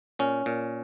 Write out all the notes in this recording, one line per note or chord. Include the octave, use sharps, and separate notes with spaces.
A#2 C#4
A#2